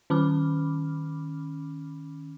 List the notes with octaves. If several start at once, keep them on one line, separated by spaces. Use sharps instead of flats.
D#3 C#4 B5 D6 F6